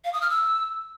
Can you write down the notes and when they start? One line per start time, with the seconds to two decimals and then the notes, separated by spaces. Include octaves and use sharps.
0.04 F5
0.13 D#6
0.21 F6
0.30 E6